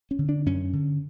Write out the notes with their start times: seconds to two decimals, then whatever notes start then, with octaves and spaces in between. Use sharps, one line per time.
0.11 C#4
0.19 D3
0.29 D4
0.46 F#2 C#4
0.73 D3